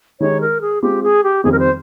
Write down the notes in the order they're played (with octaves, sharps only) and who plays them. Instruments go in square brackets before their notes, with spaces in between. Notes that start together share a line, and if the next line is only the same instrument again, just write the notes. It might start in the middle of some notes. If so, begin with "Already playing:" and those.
[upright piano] D#3 G#3 D#4 G4 [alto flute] C#5
[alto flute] A#4
G#4
[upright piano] G#3 C4 F4 [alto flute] G4
[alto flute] G#4
G4
[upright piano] F2 D#3 G3 C4 [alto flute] G#4
[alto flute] A#4
C5